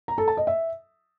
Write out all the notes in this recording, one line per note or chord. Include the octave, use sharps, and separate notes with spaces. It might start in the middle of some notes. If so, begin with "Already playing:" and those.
A#5
A4
A5
D#5
E5